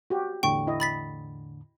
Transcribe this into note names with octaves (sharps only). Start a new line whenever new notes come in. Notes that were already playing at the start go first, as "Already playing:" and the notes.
F#4 G4
E2 A2 D3 G5 C#6
E4 D#5
B5 A6 B6